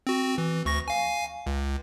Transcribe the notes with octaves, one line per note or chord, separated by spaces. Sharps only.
C4 F#4
E3
D2 C#6 A#6
F5 G#5
C#2